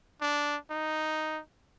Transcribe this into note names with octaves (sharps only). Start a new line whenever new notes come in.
D4
D#4